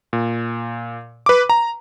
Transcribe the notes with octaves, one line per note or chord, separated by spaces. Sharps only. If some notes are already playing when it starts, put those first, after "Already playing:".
A#2
B4 D6
A#5